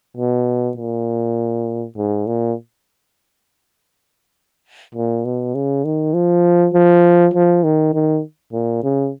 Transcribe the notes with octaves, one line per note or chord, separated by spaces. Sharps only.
B2
A#2
G#2
A#2
A#2
B2
C#3
D#3
F3
F3
F3
D#3
D#3
A#2
C#3